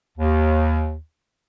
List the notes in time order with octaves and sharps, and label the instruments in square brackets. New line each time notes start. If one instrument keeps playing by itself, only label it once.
[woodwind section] D#2